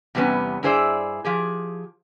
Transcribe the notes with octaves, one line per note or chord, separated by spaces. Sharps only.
E2 C3 G3 A3 B3 C#4
G2 E4 G#4 C5 D5 E5
F3 G4 G#4